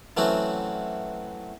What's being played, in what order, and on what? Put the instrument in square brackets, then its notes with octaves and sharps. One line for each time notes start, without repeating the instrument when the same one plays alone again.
[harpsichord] E3 F#3 A3 C4 C#4 F#4